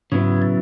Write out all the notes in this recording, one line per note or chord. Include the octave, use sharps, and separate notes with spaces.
G#2 C#3 F#3 B3 E4
A2